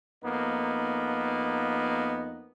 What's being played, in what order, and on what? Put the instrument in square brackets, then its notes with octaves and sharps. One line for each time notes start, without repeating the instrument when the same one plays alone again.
[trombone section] F2 A#3 B3 D#4